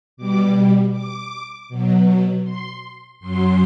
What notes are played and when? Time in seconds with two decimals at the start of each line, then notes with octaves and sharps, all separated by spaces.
0.17 B2 G3 D6
0.93 D6
1.69 B2 F#3
2.44 C6
3.20 F#2 F#3 C6